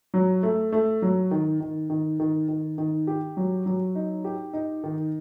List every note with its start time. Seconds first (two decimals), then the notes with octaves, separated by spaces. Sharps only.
0.14 F#3
0.43 A3
0.72 A3
1.02 F#3
1.31 D#3
1.60 D#3
1.90 D#3
2.20 D#3
2.49 D#3
2.78 D#3
3.07 G4
3.37 F#3
3.66 F#3
3.95 D#4
4.25 G4
4.54 D#4
4.84 D#3